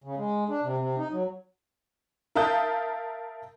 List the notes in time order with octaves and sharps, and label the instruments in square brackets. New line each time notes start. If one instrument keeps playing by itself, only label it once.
[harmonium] C#3
G#3
D4
C3
C3
D#4
F#3
[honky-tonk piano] A#4 E5 F5 A5 D#6 G6